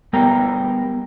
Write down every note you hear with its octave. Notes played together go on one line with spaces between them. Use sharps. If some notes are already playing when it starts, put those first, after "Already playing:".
G3 B3 A#4 G5 A#5